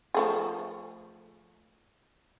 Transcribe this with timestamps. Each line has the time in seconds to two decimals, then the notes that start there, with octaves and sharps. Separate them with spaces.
0.15 F3 A3 G#4